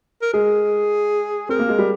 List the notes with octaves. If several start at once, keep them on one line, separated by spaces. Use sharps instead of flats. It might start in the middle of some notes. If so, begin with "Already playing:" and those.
A#4
G#3 G#4
C4 A#4
A#3
G#3
G3